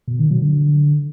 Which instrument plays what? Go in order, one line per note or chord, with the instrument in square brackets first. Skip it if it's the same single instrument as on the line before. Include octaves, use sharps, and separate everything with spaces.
[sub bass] B2
D#3
F#3
D3